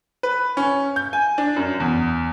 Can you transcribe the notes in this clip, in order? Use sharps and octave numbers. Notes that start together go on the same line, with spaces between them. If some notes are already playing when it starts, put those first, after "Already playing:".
B4
C#4
G6
G#5
D4
F#2
E2